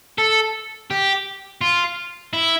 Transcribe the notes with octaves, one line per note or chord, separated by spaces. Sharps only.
A4
G4
F4
E4